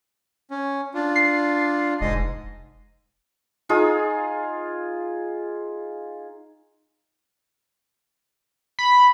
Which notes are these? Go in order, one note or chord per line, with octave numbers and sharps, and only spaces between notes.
C#4
D4 F4
C7
F1 G#2 G#3 D#5
D#4 F4 G#4 D#6
B5